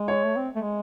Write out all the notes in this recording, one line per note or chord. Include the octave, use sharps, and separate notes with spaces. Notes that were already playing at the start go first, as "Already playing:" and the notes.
Already playing: G#3
C#5
A3
C4
A3
G#3